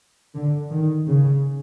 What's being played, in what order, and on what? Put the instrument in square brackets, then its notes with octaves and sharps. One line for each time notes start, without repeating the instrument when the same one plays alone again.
[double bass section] D3
D#3
C#3